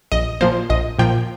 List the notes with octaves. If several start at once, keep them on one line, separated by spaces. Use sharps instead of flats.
A#1 D#5
A#2 F3 A#3 C5
A#1 D#5
A#2 F3 A#3 G5